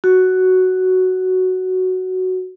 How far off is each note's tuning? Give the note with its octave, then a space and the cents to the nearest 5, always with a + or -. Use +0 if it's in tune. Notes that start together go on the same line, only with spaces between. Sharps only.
F#4 +5